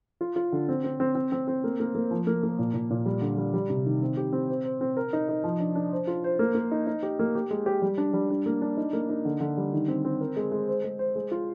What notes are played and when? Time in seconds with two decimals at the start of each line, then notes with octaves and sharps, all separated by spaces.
0.21 F4
0.36 F4
0.52 D3
0.69 C4
0.84 C4
1.00 C4
1.15 C4
1.32 C4
1.48 C4
1.64 A#3
1.80 A#3
1.95 A#3
2.11 F3
2.27 A#3
2.43 A#3
2.59 A#2
2.74 A#2
2.90 A#2
3.06 G3
3.21 D3
3.38 G3
3.54 G3
3.70 C3
3.86 D#3
4.02 C4
4.17 G4
4.33 C4
4.50 C5
4.65 C5
4.81 C4
4.97 A#4
5.13 D#4
5.29 D#4
5.44 F3
5.60 D4
5.75 D4
5.92 C5
6.07 F4
6.24 C5
6.39 A#3
6.55 A#3
6.71 D#4
6.87 D#4
7.03 G4
7.19 A#3
7.35 G4
7.51 G#3
7.66 G4
7.82 G3
7.98 D4
8.13 G3
8.30 D4
8.46 A#3
8.62 D4
8.77 D#4
8.93 A#3
9.09 D#4
9.25 D3
9.40 D3
9.57 G3
9.73 D#3
9.88 C4
10.05 C4
10.21 A#4
10.36 G#3
10.51 G#3
10.68 C5
10.84 G#3
10.99 C5
11.15 G#3
11.31 F4